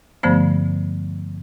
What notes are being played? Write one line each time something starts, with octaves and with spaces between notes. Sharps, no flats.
G2 D3 F3 A3 B3 C5